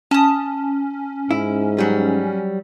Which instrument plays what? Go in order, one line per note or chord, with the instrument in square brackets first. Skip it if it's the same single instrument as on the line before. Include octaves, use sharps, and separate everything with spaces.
[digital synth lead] C#4 [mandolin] A5 D#6
[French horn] G#2 [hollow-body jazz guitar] E4
[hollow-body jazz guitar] F#3 G3